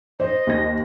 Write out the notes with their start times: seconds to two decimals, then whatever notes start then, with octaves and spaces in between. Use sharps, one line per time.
0.20 C5 D#5
0.47 D#2 A#6